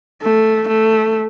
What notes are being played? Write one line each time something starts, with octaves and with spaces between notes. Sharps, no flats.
A3
A3